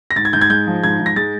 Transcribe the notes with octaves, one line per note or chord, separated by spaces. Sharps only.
A#6
G#2 A6
G#6
G#2 G6
G#6
G#3 G6
F3
G#2 G#6
G#2
A#6
G#3 A6